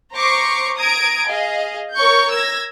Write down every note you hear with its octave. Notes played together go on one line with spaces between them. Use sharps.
C5 A#5 C#6 D6 C7
A#5 D#6 G#6 D7
G#4 D#5 F5
A#4 C#5 C#6 G6
E6 G#6 A#6